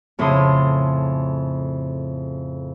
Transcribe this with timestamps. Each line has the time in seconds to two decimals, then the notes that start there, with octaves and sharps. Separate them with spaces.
0.19 F2 A2 C#3 A5 C6 D#6